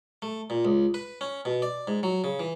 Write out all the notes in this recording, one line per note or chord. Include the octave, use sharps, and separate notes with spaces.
A3
A#2
C#2
B4
C#4
B2
D5
G#2
F#3
C#3
E3